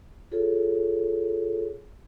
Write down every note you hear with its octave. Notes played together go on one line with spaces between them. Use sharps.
F4 G#4 A4 C#5